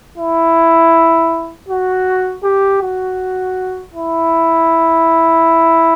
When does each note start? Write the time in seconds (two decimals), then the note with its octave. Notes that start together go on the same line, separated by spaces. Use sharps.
0.18 E4
1.69 F#4
2.43 G4
2.82 F#4
3.94 E4